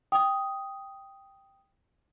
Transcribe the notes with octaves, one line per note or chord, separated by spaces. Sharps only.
G5 D#6